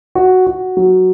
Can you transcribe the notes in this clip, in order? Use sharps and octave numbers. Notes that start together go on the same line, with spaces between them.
F#4
F#4
F#3